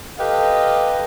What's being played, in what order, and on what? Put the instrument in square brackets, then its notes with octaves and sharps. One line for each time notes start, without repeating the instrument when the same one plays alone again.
[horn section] G4 A4 B4 D#5 F5